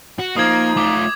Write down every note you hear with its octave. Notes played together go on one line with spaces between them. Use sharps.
F#4
F3 A#3 D#4 D#6 G#6
A3 F4 D6